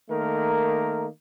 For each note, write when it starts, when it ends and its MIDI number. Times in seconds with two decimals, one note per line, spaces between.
0.10 1.07 51
0.10 1.07 57
0.10 1.07 58
0.10 1.07 70